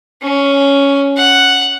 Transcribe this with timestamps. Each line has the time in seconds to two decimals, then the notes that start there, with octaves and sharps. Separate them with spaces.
0.22 C#4
1.17 F#5